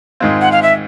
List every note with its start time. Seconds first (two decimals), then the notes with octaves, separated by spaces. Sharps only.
0.20 G#2 D#3 G#3 C4 F4
0.41 F#5
0.52 F5
0.63 E5